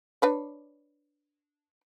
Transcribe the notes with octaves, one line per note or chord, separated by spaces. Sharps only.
D4 B4 C#5